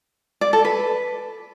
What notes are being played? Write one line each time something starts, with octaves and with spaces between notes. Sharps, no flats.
D5
A4
B4